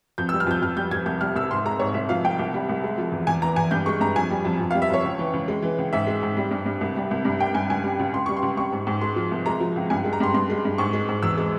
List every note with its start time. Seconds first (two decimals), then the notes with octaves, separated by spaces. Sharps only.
0.18 F2 G6
0.29 E6
0.33 G3
0.40 F6
0.47 F2 G6
0.62 F2 F6
0.76 G3 G6
0.91 F2 G#6
1.06 C2 G6
1.21 G3 F6
1.36 C2 E6
1.51 G#2 C6
1.66 G#3 A#5
1.79 G#2 C#5
1.94 C2 E5
2.09 F3 F5
2.24 C2 G5
2.39 C2
2.54 G3
2.69 C2
2.84 G#3
2.98 F3
3.12 E2
3.27 E2 G#5
3.42 E3 A#5
3.56 E2 G#5
3.71 G2 G6
3.86 G#3 C#6
4.00 G2 A#5
4.16 F2 G#5
4.30 G3
4.45 F2
4.60 F2
4.71 F5
4.75 G3
4.82 E5
4.90 F2 C#5
5.04 C#2
5.19 E3
5.33 C#2
5.48 G#3
5.63 E3
5.78 C#2
5.93 G#2 E5
6.07 G#3
6.23 G#2
6.37 G3
6.51 G2
6.66 G2
6.81 C2
6.96 G3
7.11 C2
7.25 G2
7.40 G3 G5
7.54 G2 G#5
7.70 C#2 G#5
7.84 G3
7.99 C#2
8.14 C#2 C6
8.26 G3 C#6
8.37 C6
8.43 C#2
8.57 G3 C#6
8.72 G#2
8.87 G#2
9.01 G#3 C6
9.16 F3
9.31 C2
9.46 G#3 A#5
9.60 F3
9.76 C#2
9.90 G2 G#5
10.05 G#3
10.13 A#5
10.20 G2 C6
10.34 G2 C6
10.50 G#3
10.65 G2
10.78 G#2 C#6
10.93 G#3
11.09 G#2
11.23 E2 E6
11.38 G#3